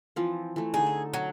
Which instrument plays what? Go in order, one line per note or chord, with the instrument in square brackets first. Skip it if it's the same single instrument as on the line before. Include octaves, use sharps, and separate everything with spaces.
[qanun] E3 F3 C4
E3 A3
[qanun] D3 D#4 [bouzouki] G#4
[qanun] A4
[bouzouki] F#3